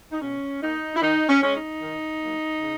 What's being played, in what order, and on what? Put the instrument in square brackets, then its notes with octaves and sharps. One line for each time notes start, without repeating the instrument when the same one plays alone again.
[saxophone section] D#4
B2 C#4
A#3 D#4
E4
D#3 D#4
C#4
G#3 C#4
D#4
D#3
F#3 A#3
C#3